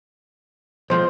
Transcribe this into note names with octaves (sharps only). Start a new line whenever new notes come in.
B1 F3 G#3 C5